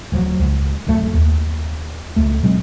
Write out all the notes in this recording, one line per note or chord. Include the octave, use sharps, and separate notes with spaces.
D1 F3 F#3
C#2
D1 C2 F#2 A3
D#2
C#2 A3
B2 F#3 G#3 C4